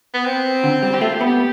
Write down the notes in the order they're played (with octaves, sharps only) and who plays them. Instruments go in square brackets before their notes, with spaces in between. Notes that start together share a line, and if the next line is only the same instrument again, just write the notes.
[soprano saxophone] B3
C4
[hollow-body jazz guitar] D3
G3
[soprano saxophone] G4
[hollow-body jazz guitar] A3 [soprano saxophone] F4
[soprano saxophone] G4
[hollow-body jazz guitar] B3
[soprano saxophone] G4